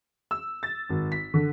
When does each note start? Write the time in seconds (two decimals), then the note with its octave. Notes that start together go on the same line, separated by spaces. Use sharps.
0.31 E6
0.63 A6
0.89 G#1
1.12 B6
1.34 D3